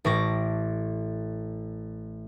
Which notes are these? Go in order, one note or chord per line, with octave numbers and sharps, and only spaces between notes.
A1 A2 C#6 D6 A#6